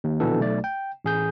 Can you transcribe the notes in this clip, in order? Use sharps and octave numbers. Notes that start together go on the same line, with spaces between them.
D#2
A#1 B2 D3 E3 A4
B1 A3 D5
G5
A1 G#4 G6